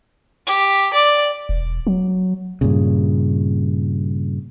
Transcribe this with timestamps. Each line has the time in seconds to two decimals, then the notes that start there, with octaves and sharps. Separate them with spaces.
0.46 G4
0.93 D5
1.49 E1
1.87 F#3
2.61 G2 A#2 C#3